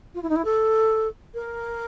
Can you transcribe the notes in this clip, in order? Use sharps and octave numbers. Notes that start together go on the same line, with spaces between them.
F4
E4
D#4
E4
A4
A#4